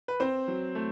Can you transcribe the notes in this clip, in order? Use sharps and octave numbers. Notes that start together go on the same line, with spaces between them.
B4
C4 C5
F#3
A3